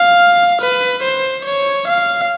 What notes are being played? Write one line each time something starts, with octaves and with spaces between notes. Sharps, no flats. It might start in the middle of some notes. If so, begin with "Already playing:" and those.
Already playing: F5
B4
C5
C#5
F5